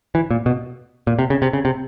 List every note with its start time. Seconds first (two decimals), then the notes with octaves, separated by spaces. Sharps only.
0.15 E3
0.31 A#2
0.46 B2
1.07 A#2
1.19 C3
1.30 C#3
1.42 C3
1.53 C#3
1.65 C3